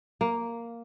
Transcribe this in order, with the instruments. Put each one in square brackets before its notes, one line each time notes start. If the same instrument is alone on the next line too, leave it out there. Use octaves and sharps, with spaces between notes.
[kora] A#3